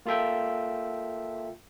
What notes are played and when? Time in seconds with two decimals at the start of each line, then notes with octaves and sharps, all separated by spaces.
0.06 A#3 F4 A4 E5 G5